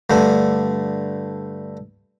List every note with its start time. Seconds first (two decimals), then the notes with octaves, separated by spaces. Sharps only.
0.10 G2 D3 A3